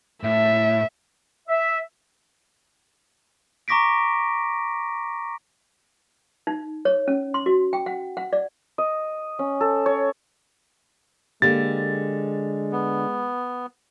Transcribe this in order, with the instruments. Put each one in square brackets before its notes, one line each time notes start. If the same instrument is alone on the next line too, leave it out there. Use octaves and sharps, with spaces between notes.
[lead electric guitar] A2 [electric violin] E5
[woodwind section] E5
[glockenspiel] A#5 C#6 D6 A#6 B6 D7
[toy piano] D#4
C#5
C#4
C6
F#4
G5
F#5
F#5
D5
[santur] D#5
C#4
A4
C#5
[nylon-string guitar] D3 A#3 G4 [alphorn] G#3 [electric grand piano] A6
[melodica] B3